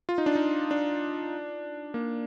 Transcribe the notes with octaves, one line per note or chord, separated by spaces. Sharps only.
F4
D#4
D4
D#4
D4
A#3